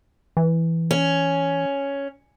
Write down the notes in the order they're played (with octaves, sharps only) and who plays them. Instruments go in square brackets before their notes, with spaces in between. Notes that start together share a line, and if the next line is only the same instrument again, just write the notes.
[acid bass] E3
[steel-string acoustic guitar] C#4